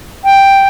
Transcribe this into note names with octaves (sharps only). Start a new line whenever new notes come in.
G5